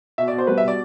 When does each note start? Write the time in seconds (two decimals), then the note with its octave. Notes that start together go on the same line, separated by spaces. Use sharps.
0.18 B2 E5
0.28 D5
0.33 B2
0.38 C5
0.47 G3 B4
0.58 E5
0.63 B2 D5